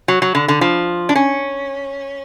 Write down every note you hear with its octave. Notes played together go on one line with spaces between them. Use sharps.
F#3
F#3
D3
D3
F3
D4
C#4